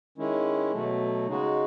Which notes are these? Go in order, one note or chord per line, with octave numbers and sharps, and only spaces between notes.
D#3 G#3 C#4 E4
B2 F#3 A3
C#3 G#3 D#4 F#4